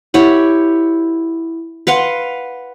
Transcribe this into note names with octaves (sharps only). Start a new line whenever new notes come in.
E4 G4 C#5 F#5
B4 F5 F#5 C6